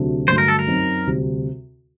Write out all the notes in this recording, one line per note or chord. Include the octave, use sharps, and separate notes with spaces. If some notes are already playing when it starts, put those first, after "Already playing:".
Already playing: D2 C3 F#3 A3 D4
G2 D3 F#3 A3 C5
A#4
A4
A#4
F#2 F#3 C4 D#4
D2 C3 G3